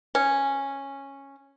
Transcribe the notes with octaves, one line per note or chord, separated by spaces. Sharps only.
C#4